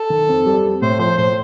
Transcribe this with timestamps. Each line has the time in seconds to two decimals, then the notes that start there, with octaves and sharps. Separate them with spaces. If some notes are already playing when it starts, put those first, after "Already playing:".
Already playing: A4
0.10 D#3
0.29 F2
0.46 G3
0.65 F2
0.82 A2 C5
0.99 F3 C5
1.18 A2 C5